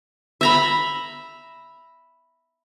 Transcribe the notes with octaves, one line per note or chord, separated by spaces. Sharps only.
E5 A#5 B5